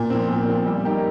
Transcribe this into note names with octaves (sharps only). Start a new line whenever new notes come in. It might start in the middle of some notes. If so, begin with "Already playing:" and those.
Already playing: A#2
F3 C4
A#2
F3 C4
G3
D#4 G4 A#4